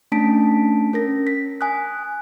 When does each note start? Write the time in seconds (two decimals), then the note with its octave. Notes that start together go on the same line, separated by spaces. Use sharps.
0.12 A3 C#4 D4 A5 B6 D7
0.93 C#4 A#4 A#6
1.27 B6
1.61 G#5 D#6 F#6